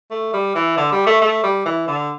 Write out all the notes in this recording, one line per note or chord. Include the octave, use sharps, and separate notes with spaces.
A3
G3
E3
D3
G3
A3
A3
G3
E3
D3